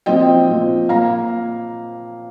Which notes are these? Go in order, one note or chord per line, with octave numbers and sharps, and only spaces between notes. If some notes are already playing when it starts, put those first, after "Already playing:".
A#2 F3 C4 D#5 G5
A#2 F3 C4
A#2 A#3 F5 A#5